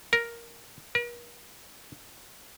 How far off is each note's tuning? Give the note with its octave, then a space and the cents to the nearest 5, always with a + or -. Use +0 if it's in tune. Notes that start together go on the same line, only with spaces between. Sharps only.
A#4 +5
A#4 +45